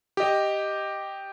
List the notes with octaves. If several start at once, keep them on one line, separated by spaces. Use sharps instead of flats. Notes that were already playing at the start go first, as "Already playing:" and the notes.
G4 D#5